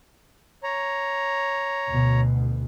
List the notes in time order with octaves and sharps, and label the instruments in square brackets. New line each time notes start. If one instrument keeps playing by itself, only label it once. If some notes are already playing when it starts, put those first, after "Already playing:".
[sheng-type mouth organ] C#5 A#5
[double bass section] D2 B2